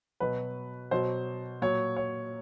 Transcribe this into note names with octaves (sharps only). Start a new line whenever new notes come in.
B2 F#3 B4
B2 F#3 C5
A#2 F#3 C#5
C#5